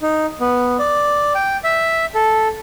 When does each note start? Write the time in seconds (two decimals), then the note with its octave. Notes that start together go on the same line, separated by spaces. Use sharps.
0.02 D#4
0.41 B3
0.79 D5
1.35 G5
1.64 E5
2.15 A4